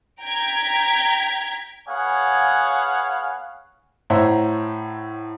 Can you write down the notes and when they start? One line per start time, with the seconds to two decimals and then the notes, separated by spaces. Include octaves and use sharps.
0.21 G5 A#5 G#6 B6
1.88 B3 G#4 C#5 F5 F#5 G#5
4.10 A2 C5 C#5 E5 F#5 A#5